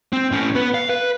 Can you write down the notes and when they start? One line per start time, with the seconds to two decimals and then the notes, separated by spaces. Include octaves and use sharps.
0.13 C4
0.31 A2 C#4
0.55 B3 B4
0.74 F5
0.89 B4